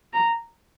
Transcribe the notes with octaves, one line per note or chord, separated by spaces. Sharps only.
A#5